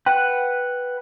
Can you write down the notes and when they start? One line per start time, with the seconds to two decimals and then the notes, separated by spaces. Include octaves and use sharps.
0.06 B4 F#5 G5